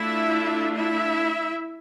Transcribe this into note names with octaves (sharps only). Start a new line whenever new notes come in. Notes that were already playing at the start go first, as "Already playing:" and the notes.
Already playing: A3 D4 E4 F4 E5
E4 E5